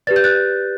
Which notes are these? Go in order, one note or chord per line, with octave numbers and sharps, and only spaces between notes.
G4 B4 D5 A6
G6
F#6 A6